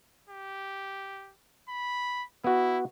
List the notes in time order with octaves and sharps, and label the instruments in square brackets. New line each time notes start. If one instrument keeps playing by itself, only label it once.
[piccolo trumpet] G4
B5
[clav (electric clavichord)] B3 F#4 [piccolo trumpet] E4